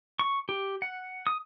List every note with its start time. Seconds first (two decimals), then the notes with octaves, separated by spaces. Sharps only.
0.19 C#6
0.49 G4
0.82 F#5
1.27 D#6